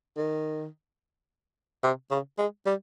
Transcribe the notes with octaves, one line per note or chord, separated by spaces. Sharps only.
D#3
C3
C#3
G#3
G3